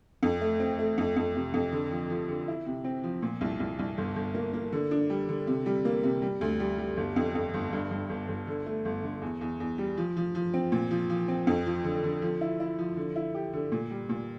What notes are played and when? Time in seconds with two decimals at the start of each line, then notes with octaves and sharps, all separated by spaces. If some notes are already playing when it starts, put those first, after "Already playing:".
0.23 F2
0.41 A3
0.60 C4
0.79 A3
0.98 F2
1.16 F2
1.35 C3
1.54 F2
1.72 D3
1.91 F3
2.10 F3
2.28 D3
2.48 E4
2.66 C3
2.84 C4
3.03 F3
3.23 A#2
3.41 C2
3.60 C2
3.79 C2
3.98 G1
4.16 G1
4.34 A#3
4.53 A#3
4.72 D3
4.91 D4
5.10 G3
5.29 D3
5.47 C3
5.66 G3
5.85 A#3
6.03 C3
6.22 G3
6.41 D2
6.60 G3
6.78 G3
6.97 G1
7.16 F2
7.35 F2
7.54 G1
7.72 G2
7.91 G2
8.10 G1
8.28 G1
8.47 D3
8.66 A3
8.85 G1
9.03 D3
9.22 E2
9.41 E2
9.60 E2
9.78 G3
9.97 F3
10.16 F3
10.35 F3
10.54 C4
10.72 A#2
10.91 F3
11.10 F3
11.28 C4
11.47 F2
11.66 F3
11.84 D3
12.04 D3
12.22 F3
12.41 E4
12.60 E4
12.79 F3
12.97 D3
13.16 E4
13.34 G4
13.53 D3
13.72 A#2
13.90 G3
14.09 A#2